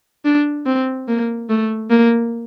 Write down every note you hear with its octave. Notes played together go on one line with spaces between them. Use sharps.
D4
C4
A#3
A3
A#3